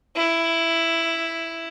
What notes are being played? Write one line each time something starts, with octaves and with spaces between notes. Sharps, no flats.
E4